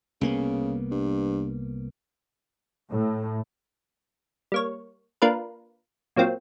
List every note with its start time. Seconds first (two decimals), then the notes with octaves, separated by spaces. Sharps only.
0.21 C2 C#3 A#3 B3
0.91 G2
2.90 A2
4.52 G3 A#3 C#5
5.22 A#3 D4 F4 A#4 B4
6.16 A#2 F#3 A#3 C4 F4